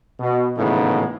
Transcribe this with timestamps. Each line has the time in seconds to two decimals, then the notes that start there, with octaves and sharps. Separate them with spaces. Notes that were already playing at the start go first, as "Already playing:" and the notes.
0.20 B2
0.58 G#1 A2 C#3 E3 B3 D#4